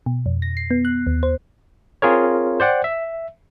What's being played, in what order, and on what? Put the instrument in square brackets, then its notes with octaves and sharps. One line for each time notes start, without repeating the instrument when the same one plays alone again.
[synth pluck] B2
F2
A#6
C7
B3
F#6
D#2
C5
[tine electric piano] C4 F4 G#4 A#4 C#5
C5 D5 F#5 G5
E5